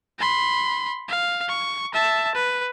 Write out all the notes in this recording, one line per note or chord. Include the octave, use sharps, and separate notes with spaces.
B5 C6
F5
C#6
E5 A5
B4